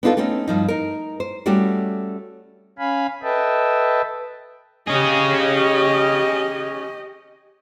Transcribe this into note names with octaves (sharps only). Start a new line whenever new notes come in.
B3 D4 D#4 F4 F#4 A4
A3 C4 C#4 D#4
G2 F3 D#4
D#4 A#4
C5
G3 A3 C#4 F#4 G4
C#4 F5 G#5 B5
A4 B4 D#5 E5 G5 A5
C#4 G4 G#4 D#5